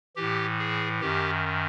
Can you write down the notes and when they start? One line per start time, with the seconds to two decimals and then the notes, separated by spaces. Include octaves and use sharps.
0.16 A2 E3 G4
0.59 G#4
1.01 F#2 D#3 G4